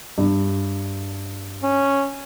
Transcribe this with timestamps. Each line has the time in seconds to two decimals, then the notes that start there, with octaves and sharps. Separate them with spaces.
0.18 G2
1.63 C#4